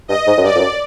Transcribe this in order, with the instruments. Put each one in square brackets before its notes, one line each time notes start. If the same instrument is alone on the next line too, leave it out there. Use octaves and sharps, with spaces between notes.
[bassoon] G2 [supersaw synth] D#5
[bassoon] G#2
F#2
[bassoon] G2 [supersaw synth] D5
[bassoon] F2
F#2